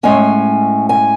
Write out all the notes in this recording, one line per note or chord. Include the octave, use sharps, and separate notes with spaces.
A2 G#3 C#4 G#5
G#5